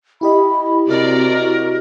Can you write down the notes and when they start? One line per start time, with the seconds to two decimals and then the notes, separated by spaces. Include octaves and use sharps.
0.21 E4 G4 D#5 B5
0.88 C3 F#4 A#4 D5